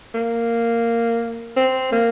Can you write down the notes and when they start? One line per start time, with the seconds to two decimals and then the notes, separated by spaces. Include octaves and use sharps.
0.14 A#3
1.57 C4
1.92 A#3